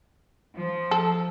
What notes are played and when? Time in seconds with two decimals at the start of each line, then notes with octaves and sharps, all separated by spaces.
0.56 F3
0.91 A4